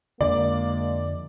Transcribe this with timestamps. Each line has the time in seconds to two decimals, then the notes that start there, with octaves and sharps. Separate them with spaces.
0.21 F2 D3 F3 G#3 A#3 D5